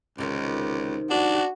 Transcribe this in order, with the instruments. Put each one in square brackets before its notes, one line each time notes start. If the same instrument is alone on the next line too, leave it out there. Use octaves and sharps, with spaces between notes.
[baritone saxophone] C#2 [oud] C3 D#3 D#4
[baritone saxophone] D4 [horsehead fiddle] F#4